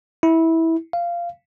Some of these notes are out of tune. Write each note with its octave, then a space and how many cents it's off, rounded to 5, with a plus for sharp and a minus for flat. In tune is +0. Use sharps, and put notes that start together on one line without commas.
E4 -15
F5 -15